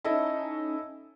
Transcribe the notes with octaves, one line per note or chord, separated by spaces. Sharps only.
C#4 D#4 E4 A4 D#5